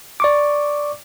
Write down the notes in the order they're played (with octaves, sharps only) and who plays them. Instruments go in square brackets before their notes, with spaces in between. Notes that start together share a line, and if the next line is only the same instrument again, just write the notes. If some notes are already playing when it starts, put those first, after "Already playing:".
[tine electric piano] D5 C#6 D6